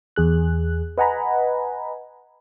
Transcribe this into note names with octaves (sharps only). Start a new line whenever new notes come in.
E2 G#4 F#6
B4 D#5 F#5 G#5 A#5 B5